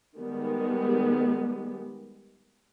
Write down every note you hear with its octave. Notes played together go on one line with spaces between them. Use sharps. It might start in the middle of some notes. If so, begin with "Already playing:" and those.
D#3 G3 G#3 B3